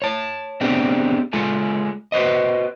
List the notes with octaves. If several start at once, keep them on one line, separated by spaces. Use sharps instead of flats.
C#5 A5
B3 C4 D4 G4 G#4
G#3 F4 G#4 A4
F#4 B4 C5 D#5